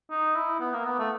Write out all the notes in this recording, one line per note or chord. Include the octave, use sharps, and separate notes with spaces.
D#4
E4
B3
A#3
B3
A3